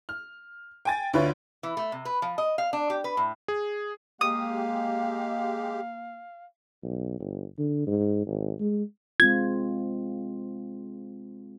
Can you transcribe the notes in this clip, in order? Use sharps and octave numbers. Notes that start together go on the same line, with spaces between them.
F6
G5 G#5 A6
D2 D3 F4 B4 C#5
E3
A3
C3
B4
F3
D#5
F5
D4
G4
B4
A2
G#4
G#3 A#3 G4 F5 D#6
B1
G1
D3
G#2
G#1
G#3
G#3 C4 F4 G#6